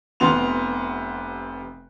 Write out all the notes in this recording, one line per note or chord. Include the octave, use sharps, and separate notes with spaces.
F1 C3 B3 C6 F7